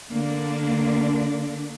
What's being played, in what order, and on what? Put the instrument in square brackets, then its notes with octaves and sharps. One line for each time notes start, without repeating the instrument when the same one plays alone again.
[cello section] D3 A#3 D4